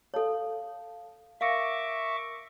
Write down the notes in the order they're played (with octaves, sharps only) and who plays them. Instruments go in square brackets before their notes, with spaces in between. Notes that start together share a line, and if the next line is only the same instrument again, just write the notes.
[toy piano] A4 C#5 [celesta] F5 A5
[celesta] A#4 A#6 C#7 [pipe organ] E5 C#6 D6 [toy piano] F5